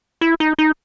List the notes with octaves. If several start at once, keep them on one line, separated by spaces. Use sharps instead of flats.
E4
D#4
D#4